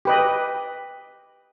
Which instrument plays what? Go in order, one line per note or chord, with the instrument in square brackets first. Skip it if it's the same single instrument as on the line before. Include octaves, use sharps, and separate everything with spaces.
[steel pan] G4 B4 D#5